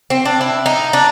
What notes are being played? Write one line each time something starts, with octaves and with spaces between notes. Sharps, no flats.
C4
D4
E4
D#4
D4